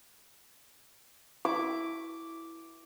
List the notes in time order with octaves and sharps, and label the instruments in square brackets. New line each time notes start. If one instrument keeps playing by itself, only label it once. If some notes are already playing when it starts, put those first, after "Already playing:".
[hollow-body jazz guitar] E4 [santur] D6